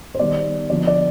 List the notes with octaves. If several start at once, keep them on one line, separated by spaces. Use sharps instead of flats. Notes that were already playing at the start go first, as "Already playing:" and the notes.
C5
D#3 G3 B3 D5
D3 F3 B3 D5
D5